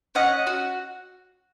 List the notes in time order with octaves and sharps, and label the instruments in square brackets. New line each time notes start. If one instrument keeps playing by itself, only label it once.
[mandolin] C#4 D#5 F#5
F#4